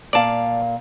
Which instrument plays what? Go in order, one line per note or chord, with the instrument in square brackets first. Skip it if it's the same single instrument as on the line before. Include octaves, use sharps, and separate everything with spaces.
[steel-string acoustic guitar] A#2 F5 [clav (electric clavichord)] D5 A5